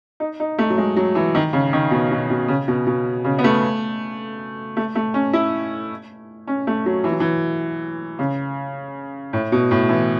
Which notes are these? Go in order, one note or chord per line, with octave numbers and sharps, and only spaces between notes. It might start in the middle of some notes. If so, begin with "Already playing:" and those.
D#4
D#4
A3
F#3
G#3
F#3
E3
D#3
C#3
D#3
B2
B2
B2
C#3
B2
B2
C#3
B3
A3
A3
A3
C#4
E4
C#4
A3
F#3
E3
F#3
E3
C#3
A2
B2
A2
E3